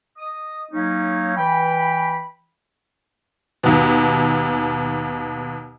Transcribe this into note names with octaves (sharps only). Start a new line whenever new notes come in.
D#5 D#6
F#3 A#3 C#4 D#4
E3 G5 B5
D#2 B2